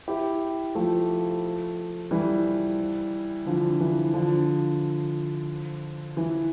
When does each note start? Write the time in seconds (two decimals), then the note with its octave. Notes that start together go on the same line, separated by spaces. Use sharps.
0.08 E4 G4
0.75 F3 A3
2.11 E3 G3
3.46 D3 F3
3.80 E3
4.14 D3 F3
6.17 E3